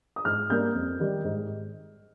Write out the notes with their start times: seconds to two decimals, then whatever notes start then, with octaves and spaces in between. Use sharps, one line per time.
0.16 D#6
0.25 G#2 F6
0.49 G3 A#3 D4 G6
0.75 F2
1.00 D#3 G3
1.25 G#2